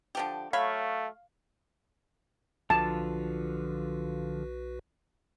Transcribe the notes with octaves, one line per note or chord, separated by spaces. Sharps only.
D3 F3 G4
F#3 A3 C#5 F5 B5
B1 D3 F3 F4 F#4 B4 A5